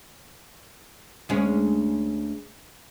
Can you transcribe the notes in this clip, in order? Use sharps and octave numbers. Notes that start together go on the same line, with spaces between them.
D2 G#3 C#4